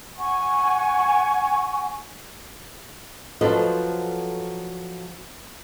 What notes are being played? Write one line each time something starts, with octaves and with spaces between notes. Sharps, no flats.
F#5 G#5 C#6
F3 F#3 A4 B4 C5 D#5